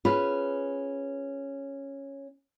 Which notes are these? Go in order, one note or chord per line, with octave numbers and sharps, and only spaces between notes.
C#4 F4 G#4 B4